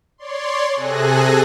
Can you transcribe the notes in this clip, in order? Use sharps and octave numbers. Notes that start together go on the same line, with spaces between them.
C#5 D5 C6
C3 G#4 A4 G#5 F#6 A#6